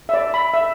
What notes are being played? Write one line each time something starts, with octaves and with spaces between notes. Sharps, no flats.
E5
D5
B5
E5